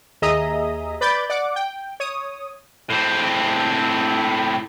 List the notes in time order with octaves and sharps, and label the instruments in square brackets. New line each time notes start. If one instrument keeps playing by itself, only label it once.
[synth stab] D#2 G#4 D#5 E5 A#5 D#6
B4 D5 B5 D6 G6 A6
D5 F#5 D6
G5
C#5 D#6
[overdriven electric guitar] A2 C4